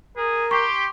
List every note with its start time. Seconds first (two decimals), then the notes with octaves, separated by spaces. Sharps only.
0.17 G#4 A#4
0.51 G4 C6 C#6